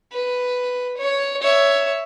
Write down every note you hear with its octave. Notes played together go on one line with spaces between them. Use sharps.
B4
C#5
C#5 E5